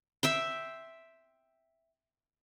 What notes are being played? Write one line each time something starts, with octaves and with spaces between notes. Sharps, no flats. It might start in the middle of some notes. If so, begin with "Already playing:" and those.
E5 G5 C6